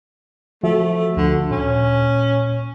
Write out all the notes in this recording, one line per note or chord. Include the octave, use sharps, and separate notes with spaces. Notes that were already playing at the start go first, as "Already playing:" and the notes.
F3 A3 F#4 E5
D2 D3
A#2 C#4